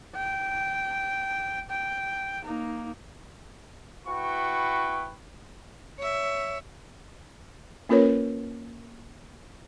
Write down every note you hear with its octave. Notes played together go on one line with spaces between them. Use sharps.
G5
G5
A#3 D#4
E4 F#4 B4 G5 C#6
C#5 E5
A#3 C#4 F4 A#4 B4 C#5